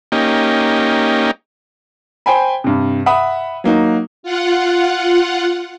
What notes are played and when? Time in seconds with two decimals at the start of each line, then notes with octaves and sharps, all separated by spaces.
0.12 A#3 C#4 D#4 G4
2.26 C5 G5 G#5 B5
2.64 G2 C3
3.06 E5 F#5 B5 D#6
3.64 F#3 A#3 D#4 F#4
4.23 F4 F#5